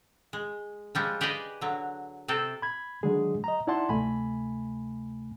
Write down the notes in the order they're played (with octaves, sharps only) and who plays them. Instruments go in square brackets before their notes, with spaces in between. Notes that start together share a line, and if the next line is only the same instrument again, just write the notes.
[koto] G#3
F3 G3 G#3
G4 G#4 B4 D5 D#5
D3 F#3
C3 C4 A4
[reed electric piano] B5 G#6
D3 D#3 F#3 G#3 G#4
D#5 A#5
D#4 E4 D5 F#5 A5 C6
D2 C3 A3 G#5 B5